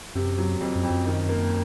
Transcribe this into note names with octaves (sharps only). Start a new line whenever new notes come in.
F#2 C3
F#3
F2
F#2
F2
F#2
D#3
A#3